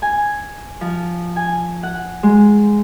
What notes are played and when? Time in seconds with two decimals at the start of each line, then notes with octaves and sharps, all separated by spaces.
0.02 G#5
0.81 F3
1.36 G#5
1.83 F#5
2.23 G#3